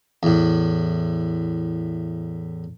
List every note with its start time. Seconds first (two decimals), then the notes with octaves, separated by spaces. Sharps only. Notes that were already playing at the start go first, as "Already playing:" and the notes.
0.23 E2 A2